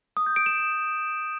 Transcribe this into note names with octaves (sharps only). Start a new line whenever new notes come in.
D#6
G6
D7
E7